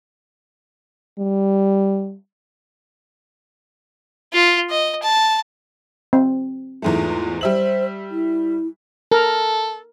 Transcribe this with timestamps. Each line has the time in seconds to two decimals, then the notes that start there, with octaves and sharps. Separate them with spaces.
1.19 G3
4.33 F4
4.70 D#5
5.02 A5
6.13 C4
6.82 E2 G#2 A3 F4
7.41 G3 C5 E5 F#7
8.11 E4
9.12 A4 A#4